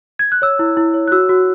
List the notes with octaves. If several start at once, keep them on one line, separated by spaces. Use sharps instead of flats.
G#6
F#6
C#5 E6
E4
E4
C#5
F#6
F#4 E6
F#4